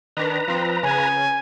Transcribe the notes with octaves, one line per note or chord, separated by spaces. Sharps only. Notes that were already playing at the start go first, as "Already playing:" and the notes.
D#3 D4 B4 A#5
F3 C4
C#3 G#5